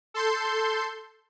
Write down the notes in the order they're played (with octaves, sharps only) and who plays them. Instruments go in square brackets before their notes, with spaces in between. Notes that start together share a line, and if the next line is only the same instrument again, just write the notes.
[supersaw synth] A4 C6 G6